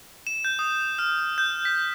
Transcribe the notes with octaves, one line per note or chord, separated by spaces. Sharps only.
E7
G6
D#6
F6
G6
B6